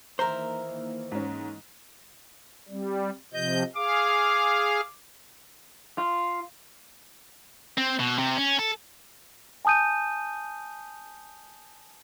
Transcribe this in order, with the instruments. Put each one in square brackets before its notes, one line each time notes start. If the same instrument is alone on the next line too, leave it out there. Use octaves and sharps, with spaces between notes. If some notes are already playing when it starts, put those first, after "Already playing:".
[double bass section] D#3 E3 A#3 [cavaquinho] A#4 E5 A#5 [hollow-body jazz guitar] C5
[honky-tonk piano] G#2 C#4
[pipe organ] G3 [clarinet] C4
[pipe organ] C3 F3 G6 [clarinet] D#5
[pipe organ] G#4 F5 [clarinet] D6
[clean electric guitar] F4
[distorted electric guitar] C4
B2
C3
C#4
A4
[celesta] G#5 A5 D#6 G6 D#7